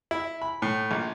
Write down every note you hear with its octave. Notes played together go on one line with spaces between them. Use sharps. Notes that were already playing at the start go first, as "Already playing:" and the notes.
E4
B5
A2
A#1